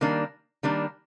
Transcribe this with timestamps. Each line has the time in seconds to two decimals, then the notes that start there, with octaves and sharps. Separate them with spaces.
0.01 D#3 G3 A#3 D4
0.63 D#3 G3 A#3 D4